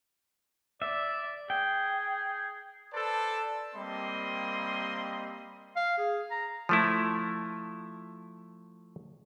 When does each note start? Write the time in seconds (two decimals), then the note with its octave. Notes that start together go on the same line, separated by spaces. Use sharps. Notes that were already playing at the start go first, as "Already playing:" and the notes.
0.82 D5 E5
1.50 G#4 G5
2.94 A4 B4 C5 D5 A5
3.75 G3 A#3 C4 D#5 B5 C6
5.76 F5
5.98 G#4
6.31 A#5
6.69 F3 A3 E4